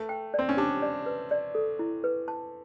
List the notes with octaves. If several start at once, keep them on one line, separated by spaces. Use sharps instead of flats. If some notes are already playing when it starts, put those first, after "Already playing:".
Already playing: A3
G5
C4 D5
C#4
D4 G4
D5
B4
D5
A4
E4
B4
A5